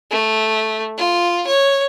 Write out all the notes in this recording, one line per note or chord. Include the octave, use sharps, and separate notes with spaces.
A3
F4
C#5